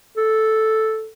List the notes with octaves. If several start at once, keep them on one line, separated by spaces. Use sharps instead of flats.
A4